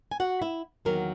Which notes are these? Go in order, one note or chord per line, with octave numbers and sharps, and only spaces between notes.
G#5
F#4 F#5
E4 E5
E2 D#3 F#3 A#3 A#4